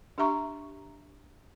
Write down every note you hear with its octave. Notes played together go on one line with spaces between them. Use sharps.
D4 G4 E5 A#5 C#6